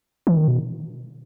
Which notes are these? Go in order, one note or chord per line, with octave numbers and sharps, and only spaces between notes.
E3
D#3
B2